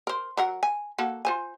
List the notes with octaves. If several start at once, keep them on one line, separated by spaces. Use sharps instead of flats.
A#4 C5
F#3 A#4 F#5
G#5
A#3 F#4 A4
F4 C5 G#5